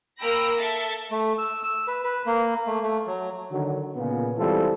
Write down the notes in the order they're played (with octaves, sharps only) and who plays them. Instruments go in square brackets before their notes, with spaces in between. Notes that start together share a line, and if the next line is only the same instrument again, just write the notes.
[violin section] A#3 A#4 G5 B5 E6 A#6
A4 E5 A5
[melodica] A3
E6
E6
B4
B4
A#3
A3
A3
F#3
[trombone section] D3 D#3 F#3
A#2 C#3 B3
E3 G3 G#3 C4 F4 A4